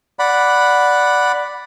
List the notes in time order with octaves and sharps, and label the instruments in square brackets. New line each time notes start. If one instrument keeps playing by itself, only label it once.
[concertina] D5 F#5 B5